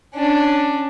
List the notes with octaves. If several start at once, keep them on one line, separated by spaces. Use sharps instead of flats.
C#4 D4